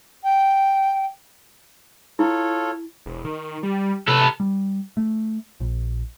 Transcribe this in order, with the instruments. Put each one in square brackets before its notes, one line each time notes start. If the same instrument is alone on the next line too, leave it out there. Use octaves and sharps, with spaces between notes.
[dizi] G5
[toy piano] E4 [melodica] F4 A4 C#5
[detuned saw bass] E1
D#3
G3
[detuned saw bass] C3 [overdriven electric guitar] A4 B4
[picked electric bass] G3
A3
A#1